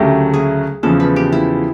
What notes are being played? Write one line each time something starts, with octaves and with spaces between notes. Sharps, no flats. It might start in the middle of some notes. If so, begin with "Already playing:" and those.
Already playing: D2 C#3 F#3 A3 G4
G#4
E2 C#3 F3 A4
B4
G4
E4